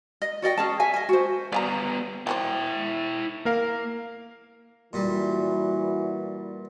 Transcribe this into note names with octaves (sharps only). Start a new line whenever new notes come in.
D#5
F#4 D5 D#5 G5
C#4 G#4 A5
E5 G#5
D#5 G#5
F#4 C5
G3 B3 D5 G5 A#5
F#3 G3 E4 C5 G5
A#3 A#4 F5
A#2 E3 G3 F#4